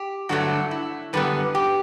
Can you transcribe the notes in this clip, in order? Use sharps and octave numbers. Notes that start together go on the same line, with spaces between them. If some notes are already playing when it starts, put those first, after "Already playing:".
Already playing: G4
G2 D3 F#3 A3 F#4
E4
F#2 D3 G3 B3 B4
G4